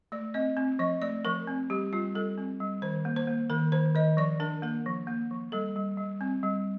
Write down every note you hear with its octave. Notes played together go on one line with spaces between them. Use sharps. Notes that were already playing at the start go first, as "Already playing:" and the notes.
A3 D5
C4 D#5
C4
F3 D#5
A3 D5
F3 A#4
C4
G3 G4
G3 F4
G3 A4
C4
G3
D#3 C5
A#3
C5
A#3
D#3 A#4
D#3 C5
D#3 D#5
F3 D5
D4 A#4
A#3 A#4
F3
A#3
F3
G3 A4
G3
G3
C4
G3